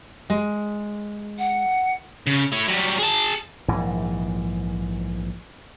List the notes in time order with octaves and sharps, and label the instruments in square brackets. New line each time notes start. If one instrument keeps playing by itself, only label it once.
[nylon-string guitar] G#3
[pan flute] F#5
[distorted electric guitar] C#3
A3 C#5
F#3 G3
G#4 A5
[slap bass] A#1 G#2 E3